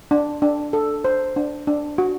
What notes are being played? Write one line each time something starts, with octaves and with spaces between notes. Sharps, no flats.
D4
D4
A4
C5
D4
D4
F#4